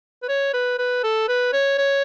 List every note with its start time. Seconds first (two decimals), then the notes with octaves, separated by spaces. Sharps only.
0.23 B4
0.29 C#5
0.54 B4
0.79 B4
1.04 A4
1.29 B4
1.53 C#5
1.79 C#5